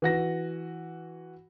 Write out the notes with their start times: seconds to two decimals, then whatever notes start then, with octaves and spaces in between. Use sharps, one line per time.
0.02 E3 F#4 A#6